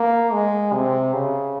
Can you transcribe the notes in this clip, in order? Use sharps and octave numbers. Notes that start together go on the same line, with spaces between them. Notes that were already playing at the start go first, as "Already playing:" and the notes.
Already playing: A#3
G#3
C3
C#3